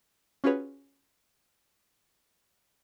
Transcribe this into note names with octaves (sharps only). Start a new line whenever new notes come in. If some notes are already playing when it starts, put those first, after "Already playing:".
C#4 F4 F#4 G#4 B4 C#5